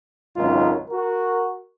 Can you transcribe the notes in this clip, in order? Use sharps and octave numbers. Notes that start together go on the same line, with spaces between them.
G#1 C#2 F#2 D#4 F4
F#4 A#4